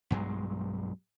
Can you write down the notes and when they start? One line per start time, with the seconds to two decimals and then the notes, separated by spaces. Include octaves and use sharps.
0.11 B1 G2 F#3 G#3